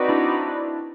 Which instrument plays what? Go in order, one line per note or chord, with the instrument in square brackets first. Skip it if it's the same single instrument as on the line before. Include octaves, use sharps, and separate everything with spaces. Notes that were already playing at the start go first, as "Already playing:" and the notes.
Already playing: [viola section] C4 D#4 F#4 B4 D5
[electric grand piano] D4 E4